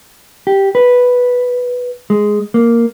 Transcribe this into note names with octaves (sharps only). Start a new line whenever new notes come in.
G4
B4
G#3
A#3